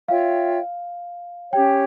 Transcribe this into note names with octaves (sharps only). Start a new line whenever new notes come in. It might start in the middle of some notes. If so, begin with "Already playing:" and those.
F4 C#5 E5 F5 G5
C#4 G4 C#5 G5